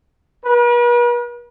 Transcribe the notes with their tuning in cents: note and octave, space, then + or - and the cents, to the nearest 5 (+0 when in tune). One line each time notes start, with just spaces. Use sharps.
B4 -45